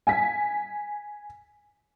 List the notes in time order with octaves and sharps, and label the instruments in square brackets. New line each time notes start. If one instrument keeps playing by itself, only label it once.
[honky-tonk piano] G#5 B6